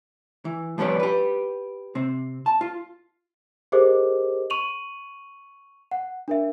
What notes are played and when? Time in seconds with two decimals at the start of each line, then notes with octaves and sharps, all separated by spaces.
0.45 E3
0.78 F3 G3 B3 C#4 D5
1.00 G4 B4
1.95 C3 C4
2.46 A5
2.61 F4
3.72 G4 G#4 A#4 C5 D#5 D6
4.50 C#6 D#7 F7 F#7
5.91 F#5
6.28 D4 A#4 E5